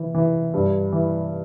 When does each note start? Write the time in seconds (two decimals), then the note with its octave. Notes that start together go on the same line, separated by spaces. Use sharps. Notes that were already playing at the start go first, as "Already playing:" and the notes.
Already playing: E3
0.14 E3
0.54 G2
0.92 E3